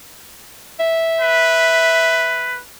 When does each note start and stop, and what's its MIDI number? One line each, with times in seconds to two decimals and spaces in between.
0.80 2.58 76
1.21 2.60 71